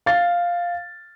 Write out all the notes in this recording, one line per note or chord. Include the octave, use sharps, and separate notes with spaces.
F5 A6